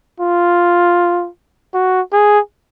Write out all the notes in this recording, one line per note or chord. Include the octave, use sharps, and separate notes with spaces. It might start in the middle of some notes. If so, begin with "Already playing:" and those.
F4
F#4
G#4